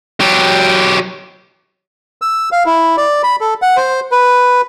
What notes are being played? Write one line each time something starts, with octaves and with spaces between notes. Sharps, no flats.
F#3 G4
E6
F5
E4
D5
B5
A4
F#5
C5
B4